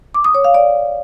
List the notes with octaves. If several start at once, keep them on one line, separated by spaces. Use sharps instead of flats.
D6
D#6
C#5
F5
D5